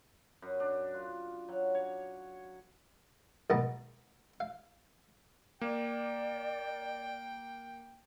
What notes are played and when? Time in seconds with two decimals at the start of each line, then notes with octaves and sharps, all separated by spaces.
0.42 F#2
0.60 D4
0.94 F4
1.49 F#3
1.75 C#5
3.50 B1 G#2 D#3 B3 A5
4.40 F5
5.61 A#3 D5 G5